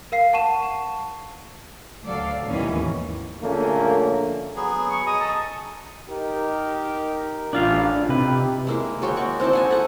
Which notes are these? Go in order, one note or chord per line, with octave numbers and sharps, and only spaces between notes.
A#4 F5 C7
F#5 A5 C#6 D#7 E7
D2 F#3 A4 D5 F5
D#2 G#2 B2 D#3 E3 C#4
A#1 D3 A3 A#3 C#4
F#3 B3 G#4
C#6
G#4 D#5 A#5 D#6
A4
D#4 G4 A#4
A1 D4 F4 F5
C3 D#4 E4 G4 B4
G#3 A#3 E4
G#3 F#4 C#5 G5
D5 C#6
C4 D#4 E4 A5
F#5 G#5 A5
A4 F#5 C#6